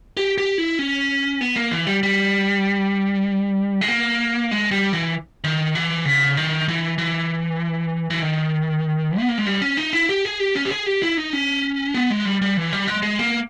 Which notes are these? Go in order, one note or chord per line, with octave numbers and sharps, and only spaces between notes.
G4
G4
E4
C#4
B3
A#3
E3
G3
G3
G#3
A#3
G#3
G3
E3
D#3
E3
C#3
D#3
E3
E3
E3
D#3
B3
A#3
G#3
G3
C#4
D#4
E4
G4
G#4
G4
C#4
G4
G#4
G4
E4
D#4
C#4
B3
G#3
G3
G3
E3
G3
G#3
G#3
A#3